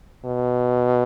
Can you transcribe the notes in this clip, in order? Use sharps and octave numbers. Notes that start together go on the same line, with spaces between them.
B2